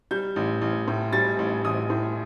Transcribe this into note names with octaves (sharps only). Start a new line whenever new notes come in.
G3 G6
A1
A1
A2
G3 A6
A1
A1 D#6
A2